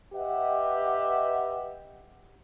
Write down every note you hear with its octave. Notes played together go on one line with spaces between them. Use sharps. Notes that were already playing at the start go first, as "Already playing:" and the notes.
G4 B4 D#5 E5 F#5